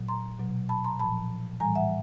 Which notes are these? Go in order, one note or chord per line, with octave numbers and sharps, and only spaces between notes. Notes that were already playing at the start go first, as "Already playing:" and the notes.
Already playing: A#2 F#3
A#5 C6
B2 F#3
A5 B5
A#5 C6
A#2 F3 A5 B5
A2 E3 G3 G#5 A#5
E5 F#5